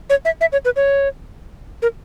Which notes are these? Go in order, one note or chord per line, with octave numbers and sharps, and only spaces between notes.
C#5
E5
E5
C#5
B4
C#5
A#4